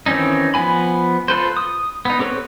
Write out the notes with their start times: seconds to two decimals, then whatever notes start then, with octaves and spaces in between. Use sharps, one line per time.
0.06 D#3 E3 C4 C#4 D#4
0.54 F3 B3 G#5 B5
1.28 F4 A4 B4 C5
1.57 D#6
2.05 B3 D#4
2.19 C4 G4 A4 B4 C#5